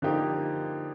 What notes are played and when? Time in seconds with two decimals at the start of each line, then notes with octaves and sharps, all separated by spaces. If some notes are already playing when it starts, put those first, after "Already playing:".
0.02 D3 F3 A#3 D#4 G4